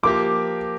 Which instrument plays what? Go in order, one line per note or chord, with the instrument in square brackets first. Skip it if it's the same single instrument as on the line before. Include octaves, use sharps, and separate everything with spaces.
[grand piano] F3 A#3 G4 [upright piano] D6